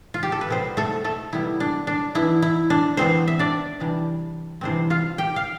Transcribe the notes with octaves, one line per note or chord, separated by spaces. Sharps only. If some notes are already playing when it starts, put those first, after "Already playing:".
F4
G4
A4
B4
C3 G3 B3 C4 C5
A3 A4
A3 A4
C3 G3 B3 E4
D4
D4
E3 B3 D4 E4
E4
D4
E3 B3 C4 D4 C5
E5
D4 D5
C3 E3 G3 D4
C3 E3 G3 C4 D4 C5
F4 F5
G4 G5
F5